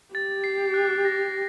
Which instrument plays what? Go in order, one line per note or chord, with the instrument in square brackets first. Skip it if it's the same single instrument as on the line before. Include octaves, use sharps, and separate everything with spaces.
[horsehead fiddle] G4 [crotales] A6
[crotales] C7
F#6
A#6